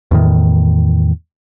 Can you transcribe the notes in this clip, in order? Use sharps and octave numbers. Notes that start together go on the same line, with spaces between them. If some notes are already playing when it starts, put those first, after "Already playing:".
E2 A2 D#3